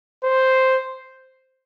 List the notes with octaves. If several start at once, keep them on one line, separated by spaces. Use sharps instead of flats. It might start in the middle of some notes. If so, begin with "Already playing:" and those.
C5